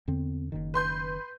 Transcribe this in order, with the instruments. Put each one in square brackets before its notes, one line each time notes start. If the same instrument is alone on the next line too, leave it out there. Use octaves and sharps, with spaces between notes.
[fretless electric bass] E2 D3 C4
F#1 F#2 D#3
[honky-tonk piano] B4 C6 G6